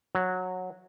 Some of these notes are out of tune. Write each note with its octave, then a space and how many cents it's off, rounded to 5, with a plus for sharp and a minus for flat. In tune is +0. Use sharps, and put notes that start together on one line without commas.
F#3 -10